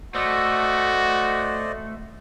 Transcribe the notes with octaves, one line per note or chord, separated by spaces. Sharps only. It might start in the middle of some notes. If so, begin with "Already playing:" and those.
A3 F#4 C5 D5 D#5